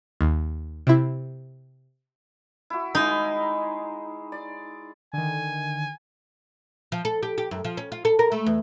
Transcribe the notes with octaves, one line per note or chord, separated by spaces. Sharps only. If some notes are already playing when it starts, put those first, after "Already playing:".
D#2
C3 E4
E4 F#4
G#3 D#4 E4 G#4
D5
D3 D#3 G#5
F3
A4
G4
G4
F#2
F3
C#4
F4
A4
A#4
A3
E2